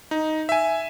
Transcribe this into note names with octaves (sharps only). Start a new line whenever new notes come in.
D#4
E5 G#5